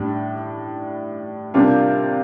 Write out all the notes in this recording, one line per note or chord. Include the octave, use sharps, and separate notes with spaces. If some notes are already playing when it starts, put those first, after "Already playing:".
Already playing: A2 G3 D4
C3 G3 A#3 D4 F4